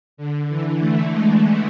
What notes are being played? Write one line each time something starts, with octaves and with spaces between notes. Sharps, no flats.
D3
E3
A3
G#3